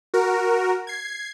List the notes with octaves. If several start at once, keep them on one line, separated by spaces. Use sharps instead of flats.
F#4 A#4
G#6 C7